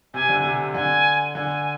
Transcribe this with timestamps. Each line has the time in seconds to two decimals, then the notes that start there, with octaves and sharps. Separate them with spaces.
0.14 C3 G#5
0.29 D3
0.44 C3
0.74 D3 G#5
1.35 D3 G#5